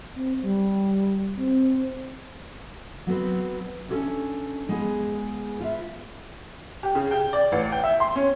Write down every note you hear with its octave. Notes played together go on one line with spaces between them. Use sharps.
C4
G3
C4
F#3 B3 C4 B4
C#4 D4 F4 G4 A4 C#5
G#3 B3 G#4
F4 B4 E5
G4
C#3
G5
D5
A1
G5
E5
C6
C#4